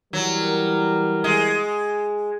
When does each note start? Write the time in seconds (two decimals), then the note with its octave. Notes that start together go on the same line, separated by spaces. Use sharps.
0.13 E3 F#3 G3 A#4
1.24 G#3